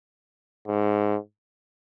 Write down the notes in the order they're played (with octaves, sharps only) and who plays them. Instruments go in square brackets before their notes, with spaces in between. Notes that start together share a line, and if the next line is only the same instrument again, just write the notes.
[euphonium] G#2